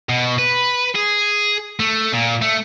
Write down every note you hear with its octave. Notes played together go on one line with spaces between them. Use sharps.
B2
B4
G#4
A3
A#2
A3